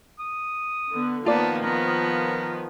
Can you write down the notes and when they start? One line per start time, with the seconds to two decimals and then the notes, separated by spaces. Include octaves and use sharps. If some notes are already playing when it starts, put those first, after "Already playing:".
0.19 D#6
0.92 D3 B3
1.26 D#3 F3 A#3 B3 F4 D5 A5
1.63 B3 A#4